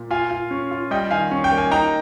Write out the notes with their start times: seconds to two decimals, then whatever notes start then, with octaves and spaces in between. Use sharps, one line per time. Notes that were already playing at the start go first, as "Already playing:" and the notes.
Already playing: A#2
0.11 F4 F5 G#5
0.31 F4
0.51 C#4
0.71 F4
0.91 G3 D#5 G5
1.11 D#3 F5 G#5
1.31 C#4
1.44 G5
1.52 A#3
1.58 G#5
1.71 D#4 G5 A#5